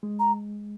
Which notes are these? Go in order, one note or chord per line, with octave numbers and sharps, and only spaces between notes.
G#3
A#5